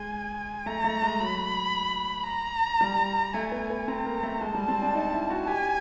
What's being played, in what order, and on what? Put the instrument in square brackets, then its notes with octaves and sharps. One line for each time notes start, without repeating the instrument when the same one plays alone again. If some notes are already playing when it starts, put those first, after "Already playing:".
Already playing: [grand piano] G#3 [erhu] G#5
[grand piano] A3 [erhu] A#5
[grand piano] A3
G#3
[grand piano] F#3 [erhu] B5
[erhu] A#5
[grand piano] G3
[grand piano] A3 [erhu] G#5
[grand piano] B3
B3
[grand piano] C4 [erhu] A#5
[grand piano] A#3
A3
[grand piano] G#3 [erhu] A5
[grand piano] G3
C4
D4
D#4
E4
F#4
[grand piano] G4 [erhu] G#5